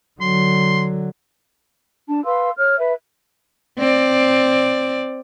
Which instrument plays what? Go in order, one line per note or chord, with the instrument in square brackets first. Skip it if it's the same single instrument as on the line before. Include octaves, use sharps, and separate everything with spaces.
[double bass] D3 F#3 [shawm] C6
[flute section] D4 A5
B4 F5 C6 E6
C#5 F6
B4 E5
[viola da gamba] C4 D5